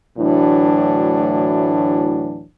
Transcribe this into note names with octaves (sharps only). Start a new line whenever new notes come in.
D2 A2 E3 F#3 D4